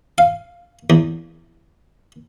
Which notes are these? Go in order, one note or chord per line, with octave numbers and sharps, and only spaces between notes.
F5
E2